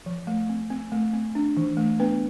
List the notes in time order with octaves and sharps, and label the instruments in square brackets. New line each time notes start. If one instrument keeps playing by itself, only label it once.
[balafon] F3
A3
C4
C4
A3
C4
D4
E3
A3
B3 D4 B4